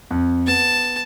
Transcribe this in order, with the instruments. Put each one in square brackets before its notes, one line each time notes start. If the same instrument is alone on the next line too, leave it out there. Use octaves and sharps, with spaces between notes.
[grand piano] F2
[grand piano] B3 [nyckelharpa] A5